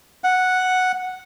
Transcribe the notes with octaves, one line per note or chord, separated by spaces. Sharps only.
F#5